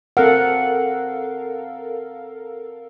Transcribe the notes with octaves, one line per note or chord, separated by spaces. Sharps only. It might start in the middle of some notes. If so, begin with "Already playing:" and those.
C4 A4 A#4 F5 F#5